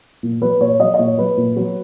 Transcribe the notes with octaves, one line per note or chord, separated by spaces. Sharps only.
A#2
F#3 B4
A#2 C#5
F#3 D#5
D#5
A#2 C#5
F#3 B4
A#2
F#3